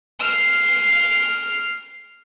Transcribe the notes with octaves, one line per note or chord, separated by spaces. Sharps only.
F6 C7